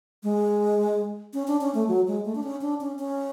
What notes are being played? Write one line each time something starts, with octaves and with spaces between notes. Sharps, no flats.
G#3
C#4
D4
C#4
A3
F#3
G#3
A3
D4
C#4
D4
C#4
C#4